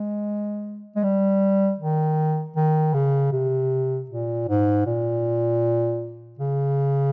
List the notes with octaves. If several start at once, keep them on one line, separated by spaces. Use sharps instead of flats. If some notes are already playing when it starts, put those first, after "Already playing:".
Already playing: G#3
G#3
G3
D#3
D#3
C#3
C3
A#2
G#2
A#2
C#3